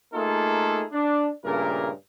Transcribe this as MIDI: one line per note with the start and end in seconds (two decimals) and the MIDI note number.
0.13 0.84 57
0.13 0.84 58
0.13 0.84 63
0.13 0.84 65
0.13 0.84 68
0.13 0.84 69
0.92 1.27 62
1.44 1.90 43
1.44 1.90 46
1.44 1.90 49
1.44 1.90 57
1.44 1.90 58
1.44 1.90 70